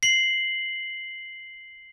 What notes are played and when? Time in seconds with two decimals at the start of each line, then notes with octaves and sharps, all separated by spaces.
0.03 C7 F#7